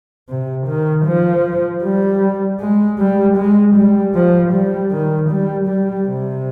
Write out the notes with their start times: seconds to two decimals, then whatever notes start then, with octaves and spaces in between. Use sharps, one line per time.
0.29 C3
0.68 D#3
1.06 F3
1.83 G3
2.60 G#3
2.99 G3
3.37 G#3
3.75 G3
4.15 F3
4.52 G3
4.92 D#3
5.30 G3
5.68 G3
6.08 C3